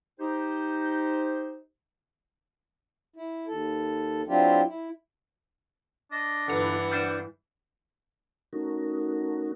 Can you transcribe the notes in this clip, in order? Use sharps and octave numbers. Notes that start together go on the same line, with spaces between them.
D#4 G4 C5
E4
D#2 A4
F#3 C4 D4 E4 F4 G4
E4
D4 D#5
G1 G2 E3 B4 F#5 A#5
G3 D4 C5
A3 C#4 D#4 F#4 A#4